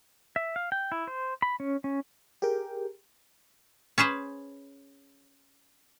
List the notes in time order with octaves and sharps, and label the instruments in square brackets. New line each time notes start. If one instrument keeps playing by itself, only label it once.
[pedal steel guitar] E5
F5
G5
E4
C5
B5
C#4
C#4
[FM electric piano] G4 G#4 A#4 G5
[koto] C#4 G#4 B4 C5